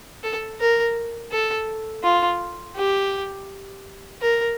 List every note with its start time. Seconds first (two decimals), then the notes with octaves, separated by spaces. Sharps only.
0.23 A4
0.60 A#4
1.31 A4
2.04 F4
2.76 G4
4.22 A#4